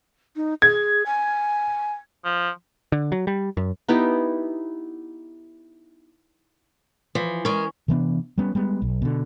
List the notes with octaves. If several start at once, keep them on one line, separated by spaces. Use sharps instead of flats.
D#4
G#4 G#6
G#5
F3
D3
F#3
G3
F#2
B3 D#4 E4 G4
E3 F3
G#3 C#4 A#4
C3 E3 B3 D4
G3 B3 C#4
G3 G#3 B3
B1
B2 D3